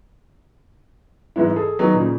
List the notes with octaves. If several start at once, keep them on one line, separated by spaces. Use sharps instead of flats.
G#2 E3 G#3 B3 E4
G#4 A4
D#3 F#3 B3 D#4
A#2 C#3